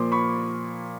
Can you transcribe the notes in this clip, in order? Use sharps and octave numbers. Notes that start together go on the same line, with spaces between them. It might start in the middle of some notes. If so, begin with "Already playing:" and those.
Already playing: A#2 F3 A#3 C6 D6
B5 C#6